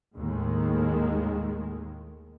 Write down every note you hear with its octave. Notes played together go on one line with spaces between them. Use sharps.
D#2 A2 D#3 G#3